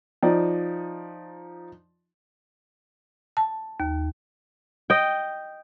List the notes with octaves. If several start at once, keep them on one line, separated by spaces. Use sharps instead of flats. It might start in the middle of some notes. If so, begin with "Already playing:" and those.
F3 D#4 D5
A5
D#2
D#5 G5